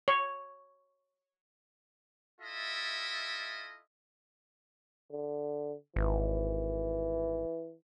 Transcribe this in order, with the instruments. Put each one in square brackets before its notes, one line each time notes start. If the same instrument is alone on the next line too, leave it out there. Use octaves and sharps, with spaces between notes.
[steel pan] C#5
[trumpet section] E4 F4 A4 D#5 E5
[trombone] D3
[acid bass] G#1 [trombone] E3